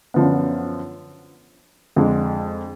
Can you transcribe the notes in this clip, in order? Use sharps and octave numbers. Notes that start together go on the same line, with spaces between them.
F#2 D3 F3 B3
F2 D3 G#3